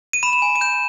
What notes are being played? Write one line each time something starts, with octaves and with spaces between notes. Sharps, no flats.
D#7
B5 E7
E7
G#5
D#7
G6 E7